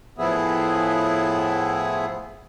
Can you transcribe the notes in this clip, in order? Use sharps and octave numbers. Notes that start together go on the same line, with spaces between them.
A2 F3 B3 E4 G#4